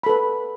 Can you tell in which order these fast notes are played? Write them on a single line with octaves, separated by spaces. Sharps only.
B5 A4 B4